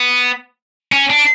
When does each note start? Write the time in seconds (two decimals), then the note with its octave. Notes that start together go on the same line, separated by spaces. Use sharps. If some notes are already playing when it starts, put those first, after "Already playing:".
Already playing: B3
0.92 C#4
1.10 D4